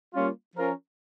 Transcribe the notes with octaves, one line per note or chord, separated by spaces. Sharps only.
G3 A#3 C#4 F4
F3 C#4 F4 A#4